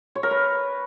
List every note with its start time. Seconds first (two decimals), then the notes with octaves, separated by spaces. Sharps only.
0.15 C#5
0.23 A#4
0.31 B4